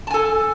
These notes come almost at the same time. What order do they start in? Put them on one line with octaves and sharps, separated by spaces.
A5 G#5 A4